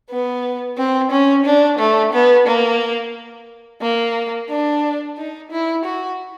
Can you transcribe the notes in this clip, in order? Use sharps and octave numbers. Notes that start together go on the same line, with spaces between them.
B3
C4
C#4
D4
A3
B3
A#3
A#3
D4
D#4
E4
F#4